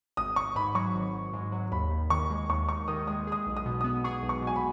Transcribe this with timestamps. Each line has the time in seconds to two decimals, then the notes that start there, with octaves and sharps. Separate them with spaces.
0.17 G#1 D#6
0.36 G#1 C#6
0.55 G#2 B5
0.75 F#3 C#6
0.94 G#1
1.13 G#1
1.33 G#2
1.52 F#3
1.72 D#2 B5
1.91 D#2
2.10 D#3 C#6
2.30 G#3
2.49 D#2 C#6
2.68 D#2 C#6
2.88 D#3 D#6
3.07 G#3 D#6
3.27 G#4 D#6
3.46 B1
3.57 D#6
3.66 B2
3.81 B3 D#6
4.04 G#4 C#6
4.23 B1
4.29 C#6
4.42 B2
4.47 G#5
4.56 B5